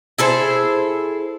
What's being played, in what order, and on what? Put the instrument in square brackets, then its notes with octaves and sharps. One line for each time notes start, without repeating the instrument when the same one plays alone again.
[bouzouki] E4 G#4 A4 C5